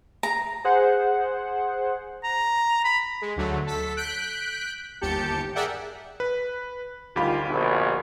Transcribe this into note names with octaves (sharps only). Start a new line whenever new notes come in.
A#5
G#4 C5 F#5
A#5
B5
G#3
D2 D3 F#3 A3
A4 B6
F#6 G6 B6 D7
G1 D#2 G4 A5 G6 C#7
G#4 A#4 D5 E5 F#5 G5
B4
D2 D#3 G3 F4 G4 B5
A#1 B2